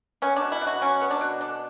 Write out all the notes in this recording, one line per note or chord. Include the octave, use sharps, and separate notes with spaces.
B3 C#4
D4
B2
E4
B2
F#4
F#3 C#4
B3
D4
B2
D3 D4